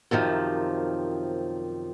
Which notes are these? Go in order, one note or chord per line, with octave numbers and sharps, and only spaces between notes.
F#2 C3 D#3 F3